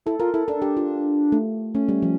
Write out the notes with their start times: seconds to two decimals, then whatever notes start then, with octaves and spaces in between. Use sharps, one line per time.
0.06 E4 A4
0.20 F4 A#4
0.34 E4 A4
0.48 D4 A4
0.62 G4
0.77 F4
1.32 A3
1.74 A3 C#4
1.89 G3
2.03 F3